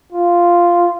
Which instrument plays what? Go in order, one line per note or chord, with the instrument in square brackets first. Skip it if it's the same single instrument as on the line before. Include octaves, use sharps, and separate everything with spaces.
[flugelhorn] F4